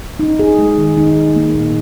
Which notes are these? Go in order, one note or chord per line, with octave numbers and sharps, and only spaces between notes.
D#4
G#4
G#3
D#3
D#4
G#4
A#3
A#2